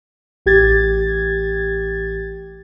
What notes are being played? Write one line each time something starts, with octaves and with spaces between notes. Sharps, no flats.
A1 G4 G#6 A6